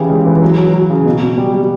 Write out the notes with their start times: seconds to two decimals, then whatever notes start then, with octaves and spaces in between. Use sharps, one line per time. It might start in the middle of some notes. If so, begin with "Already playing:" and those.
Already playing: C#3 E3 G4
0.10 C#2
0.26 E3
0.42 F#3
0.58 F#3
0.73 F#3
0.90 C#3
1.06 B2
1.22 B2
1.38 G3
1.54 G3